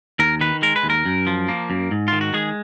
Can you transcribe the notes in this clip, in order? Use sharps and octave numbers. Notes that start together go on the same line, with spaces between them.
D#2 A#4
D#3 B4
G#3 A#4
B4
D#2
A#4
F#2
F3
A#3
F#2
G#2
D#3 F4
F#4
G#3 G#4